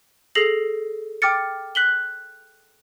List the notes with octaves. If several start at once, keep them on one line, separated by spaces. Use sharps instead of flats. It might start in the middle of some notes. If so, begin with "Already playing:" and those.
G#4 A4 A#6 C7 F7 F#7
G5 D6 F6 A6 C#7
F#6 B6 F#7 G7